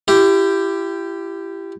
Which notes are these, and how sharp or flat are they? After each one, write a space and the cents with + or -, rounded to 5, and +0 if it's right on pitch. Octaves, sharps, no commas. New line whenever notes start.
E4 +35 G4 +0